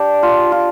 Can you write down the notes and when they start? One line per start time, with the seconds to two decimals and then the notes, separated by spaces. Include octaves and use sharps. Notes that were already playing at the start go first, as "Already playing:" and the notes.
Already playing: G3 D4 G4
0.23 F4
0.52 F4